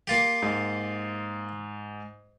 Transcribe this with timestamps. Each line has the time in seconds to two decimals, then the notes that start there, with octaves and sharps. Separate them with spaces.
0.07 A#3 F4 G4
0.42 G#2